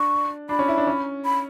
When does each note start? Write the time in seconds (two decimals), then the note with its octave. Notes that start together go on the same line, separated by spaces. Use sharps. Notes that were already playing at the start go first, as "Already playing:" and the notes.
Already playing: D4 C#6
0.49 D4 B5
0.59 C#4
0.68 E4
0.78 D4
0.87 C#4
1.25 B5